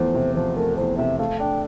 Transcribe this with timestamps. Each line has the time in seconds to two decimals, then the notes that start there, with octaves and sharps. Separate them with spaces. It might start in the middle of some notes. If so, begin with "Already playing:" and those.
Already playing: E2 F3 A3 C5
0.14 C3
0.36 F3 C5
0.57 A3 A#4
0.76 E2 C5
0.97 C3 E5
1.18 A3 F5
1.39 D4 G5